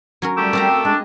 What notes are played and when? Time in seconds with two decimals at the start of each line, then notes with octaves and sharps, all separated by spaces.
0.22 F#3 C#4 A#4
0.37 G3 A3 G4 D6 E6
0.53 C4 F#4 A#4 D5 F5 A#5
0.71 A4
0.85 G#3 D4